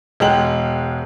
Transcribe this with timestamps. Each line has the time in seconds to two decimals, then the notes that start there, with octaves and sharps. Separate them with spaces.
0.20 E1 G#3 G5 F#7